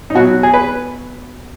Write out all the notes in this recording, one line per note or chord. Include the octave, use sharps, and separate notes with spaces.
D#4
B2 F#3 F#4
G#4
B4